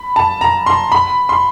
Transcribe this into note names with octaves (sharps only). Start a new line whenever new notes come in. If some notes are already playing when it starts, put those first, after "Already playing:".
Already playing: B5
A5
A#5
C6
B5
C6